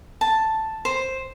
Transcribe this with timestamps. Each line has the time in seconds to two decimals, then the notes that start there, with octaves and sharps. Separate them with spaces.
0.21 A5
0.85 C5